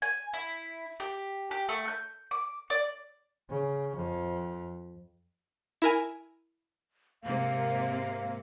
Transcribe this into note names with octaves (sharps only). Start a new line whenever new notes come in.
G#5
E4
G4
G4
A3
G6
D6
D5
C#3
F2
E4 A#4 G#5
G#2 C3 A#3 F5